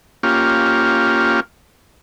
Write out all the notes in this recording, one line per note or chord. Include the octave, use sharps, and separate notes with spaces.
A#3 C#4 F4 G4